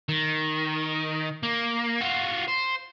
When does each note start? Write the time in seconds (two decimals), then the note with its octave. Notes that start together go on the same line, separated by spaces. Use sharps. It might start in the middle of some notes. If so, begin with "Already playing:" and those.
0.09 D#3
1.43 A#3
2.01 F4 F#4
2.48 C5